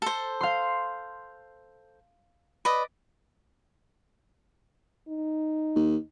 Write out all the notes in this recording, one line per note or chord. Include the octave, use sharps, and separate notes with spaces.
A4 C5
F5 C6
B4 D5 D#5
D#4
D#2